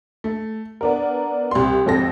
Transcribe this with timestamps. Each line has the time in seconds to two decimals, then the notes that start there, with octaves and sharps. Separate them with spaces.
0.24 A3
0.81 B3 D4 A#4
1.51 C2 C6
1.86 G#1 F2 A4 A#6